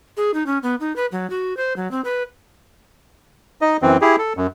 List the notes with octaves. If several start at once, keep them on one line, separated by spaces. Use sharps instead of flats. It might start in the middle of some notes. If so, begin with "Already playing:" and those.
G#4
D#4
C#4
B3
D#4
B4
F#3
F#4
C5
F#3
C4
B4
D#4 D#5
F#2 E3 C4
E4 G4 G#4
A4
F#2